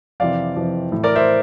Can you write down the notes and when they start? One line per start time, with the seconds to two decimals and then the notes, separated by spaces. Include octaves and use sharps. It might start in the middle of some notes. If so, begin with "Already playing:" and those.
0.20 F2 C3 E3 D5 F5
0.56 F2 C3 E3
0.92 A2 E3
1.04 A#4 D5
1.15 C5 E5